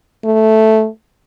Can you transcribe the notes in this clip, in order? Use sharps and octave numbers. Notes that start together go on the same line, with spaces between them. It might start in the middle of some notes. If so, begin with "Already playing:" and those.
A3